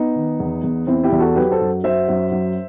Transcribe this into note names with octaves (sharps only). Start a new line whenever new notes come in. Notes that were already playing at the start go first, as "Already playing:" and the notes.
Already playing: B3 D#4
D#3
E2
E2
E2 C4 E4
E4 G4
E2
F#4 A4
F#3 G4 B4
A4 C5
F#2
F#3 C5 E5
F#2
F#3